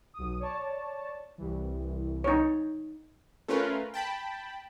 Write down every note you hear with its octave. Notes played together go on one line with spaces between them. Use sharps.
B1 D#6
C#5 D5 A5
C2 E3
D#4 C#5
A3 C#4 F4 A#4 B4
G5 A5 B5